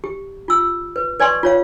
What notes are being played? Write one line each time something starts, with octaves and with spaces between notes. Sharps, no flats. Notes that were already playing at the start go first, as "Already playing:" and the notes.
G4
F4 E6
B4
B4 D5 G#5 C6 C#6
F4 C#5 F5